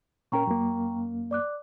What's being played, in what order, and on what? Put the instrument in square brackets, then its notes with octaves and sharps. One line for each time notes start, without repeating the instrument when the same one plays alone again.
[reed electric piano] A#2 C#4 A#4 [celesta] G5 A#5 C#6
[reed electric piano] F#2 A#3
[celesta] D5 D6 F#6